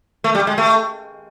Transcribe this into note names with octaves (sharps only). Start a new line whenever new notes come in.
A3
G3
G#3
A3